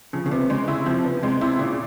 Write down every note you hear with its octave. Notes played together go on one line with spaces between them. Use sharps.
C#3 F3
C#3
C3 B3
C#3 G#3
C#3 E4
C3 F3
B3
C3 G#3
C3 E4
A#2 C#3